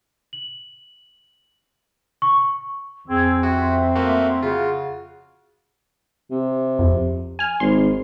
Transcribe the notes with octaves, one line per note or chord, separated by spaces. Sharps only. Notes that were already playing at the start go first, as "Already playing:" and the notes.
F#7
C#6
F2 C4 G#4 E6 G#6
C4 F#4 E5 C6
A3 A#3 F#4
C#3 F4 F#4
C3
F2
G#5 F6
G#1 C6